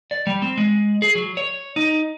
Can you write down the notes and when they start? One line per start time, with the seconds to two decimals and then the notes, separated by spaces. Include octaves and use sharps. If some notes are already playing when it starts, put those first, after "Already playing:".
0.11 D5
0.27 G3
0.42 C4
0.58 G#3
1.02 G#4
1.15 F#3
1.37 C#5
1.76 D#4